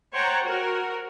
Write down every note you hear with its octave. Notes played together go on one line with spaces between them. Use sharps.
C5 C#5 F#5 G5 A5 A#5
F#4 A#4